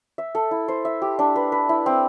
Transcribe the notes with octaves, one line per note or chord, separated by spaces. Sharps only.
E5
A4
E4
C5
E5
G4
D4
B4
B4
E4
C4